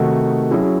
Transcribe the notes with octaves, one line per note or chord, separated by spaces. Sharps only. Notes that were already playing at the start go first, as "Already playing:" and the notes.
Already playing: C3 D#3 A3 D#4 F#4
F#3 C#4 E4 G#4